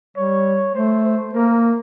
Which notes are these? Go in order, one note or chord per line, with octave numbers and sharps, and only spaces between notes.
G3 C#5
A3 C5
C5
A#3 A#4